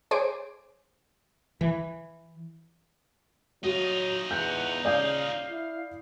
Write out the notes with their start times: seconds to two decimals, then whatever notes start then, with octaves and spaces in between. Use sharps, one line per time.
0.11 G#4 C5 C#5 D6 D7
1.61 E3
3.64 F#3 D#4 F4 F#4
4.31 E2 F#5 G6
4.85 C#3 D5 F5 D#6 G6
5.49 E4